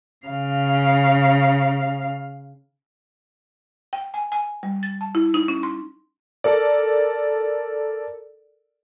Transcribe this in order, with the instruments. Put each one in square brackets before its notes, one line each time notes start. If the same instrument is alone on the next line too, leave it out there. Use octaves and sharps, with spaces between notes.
[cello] C#3 F5
[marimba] G5
G#5
G#5
G3
A6
A5
E4
D#4
C#4
C6
[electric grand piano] A4 A#4 D5